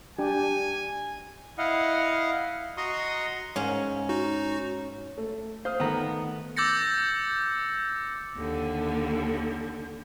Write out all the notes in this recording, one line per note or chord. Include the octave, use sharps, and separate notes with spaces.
D4 G4 G#5
E4 D#5 F5 F#5
F#4 D#5 A#5 C6 C#6 D#6
G#2 C#4
D#4 F#4
A3
C5 F5 D#6 F6
D#3 A3 B3 A#5
D6 E6 G6 A6 A#6 C#7
D#2 D3